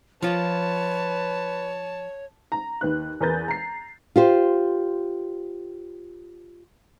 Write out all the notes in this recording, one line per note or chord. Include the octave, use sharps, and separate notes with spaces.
F3 F4 B4 C#5 A5
A#5
D#2 B4 F#6
E2 A#4 B4 G6 A6
A#5 C7
F4 G4 C5